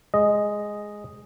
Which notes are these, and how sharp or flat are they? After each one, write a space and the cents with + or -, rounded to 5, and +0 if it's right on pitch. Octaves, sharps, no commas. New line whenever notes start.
G#3 +0 D#5 +0